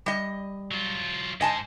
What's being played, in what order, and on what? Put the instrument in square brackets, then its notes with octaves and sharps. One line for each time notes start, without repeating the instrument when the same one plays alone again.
[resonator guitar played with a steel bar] G3 D#5
[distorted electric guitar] F#3 F4
[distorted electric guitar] G#2 C5 [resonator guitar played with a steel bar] D#5 G#5 A5